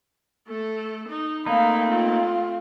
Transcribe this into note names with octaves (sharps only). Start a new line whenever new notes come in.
A3 A4
D#4
A3 A#3 C4 D#4 F5 B5
F4